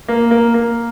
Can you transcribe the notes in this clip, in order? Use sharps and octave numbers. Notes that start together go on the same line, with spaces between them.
A#3
A#3
A#3